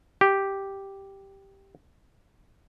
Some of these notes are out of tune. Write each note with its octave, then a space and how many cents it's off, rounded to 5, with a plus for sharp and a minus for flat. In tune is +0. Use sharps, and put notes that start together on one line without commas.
G4 -5